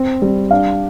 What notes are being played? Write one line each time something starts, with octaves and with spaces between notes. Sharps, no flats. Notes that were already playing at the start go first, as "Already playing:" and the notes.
Already playing: C4
G3
D4 F5